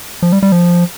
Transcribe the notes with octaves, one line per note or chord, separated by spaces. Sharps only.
F3
G3
G3
F3